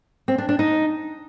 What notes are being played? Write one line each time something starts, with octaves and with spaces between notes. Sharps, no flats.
C4
D4
D4
D#4